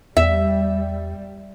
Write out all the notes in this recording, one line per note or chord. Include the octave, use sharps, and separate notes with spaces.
E2 G3 E5